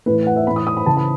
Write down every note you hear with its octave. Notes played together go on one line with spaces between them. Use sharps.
A2 E3 B4
F#5
E5
A2 E3 B5
D#6
D#6
B5
C#3 E3 A5
B5